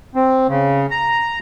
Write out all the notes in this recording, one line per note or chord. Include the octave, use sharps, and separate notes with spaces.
C4
C#3
A#5